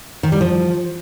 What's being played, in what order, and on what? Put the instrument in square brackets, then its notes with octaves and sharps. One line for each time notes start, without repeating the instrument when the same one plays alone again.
[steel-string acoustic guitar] D#3
G3
F3